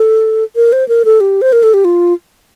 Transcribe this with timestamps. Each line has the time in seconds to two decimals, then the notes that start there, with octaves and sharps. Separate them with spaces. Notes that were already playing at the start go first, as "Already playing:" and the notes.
Already playing: A4
0.56 A#4
0.73 C5
0.88 A#4
1.05 A4
1.20 G4
1.42 C5
1.53 A#4
1.63 A4
1.74 G4
1.85 F4